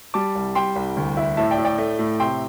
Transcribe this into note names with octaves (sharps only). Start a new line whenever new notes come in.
G3 A5 D6
C2
G3 G5 C6
C2
D2
E4
A2 E5 A5
D5 G5
A2
D5 G5
A3
A2
C3 G5 C6